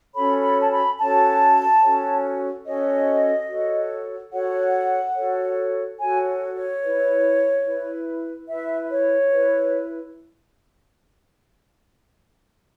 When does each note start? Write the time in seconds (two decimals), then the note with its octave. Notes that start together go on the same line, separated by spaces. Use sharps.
0.15 C#4 F#4 A4 C#5 B5
0.42 B5
0.61 A5
0.71 B5
0.98 C#4 F#4 A4 C#5 A5
1.82 C#4 F#4 A4 C#5
2.66 C#4 F#4 A4 C#5 D#5
3.48 F#4 A4 C#5
4.32 F#4 A4 C#5 F#5
5.15 F#4 A4 C#5
5.99 F#4 A4 C#5 G#5
6.55 C#5
6.82 E4 B4
7.66 E4 B4
8.49 E4 B4 E5
8.91 C#5
9.33 E4 B4